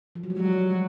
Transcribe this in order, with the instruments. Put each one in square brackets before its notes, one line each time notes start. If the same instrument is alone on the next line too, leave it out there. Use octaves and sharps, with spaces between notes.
[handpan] F3
F#3
G3
[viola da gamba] F#3 [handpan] G#3
[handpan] G3